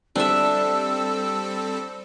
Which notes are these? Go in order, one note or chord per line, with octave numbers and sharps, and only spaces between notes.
G3 C4 D4 A4 E5 E6